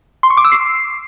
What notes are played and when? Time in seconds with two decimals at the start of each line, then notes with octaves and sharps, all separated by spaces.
0.23 C6
0.30 C#6
0.37 D6
0.44 E6
0.52 C7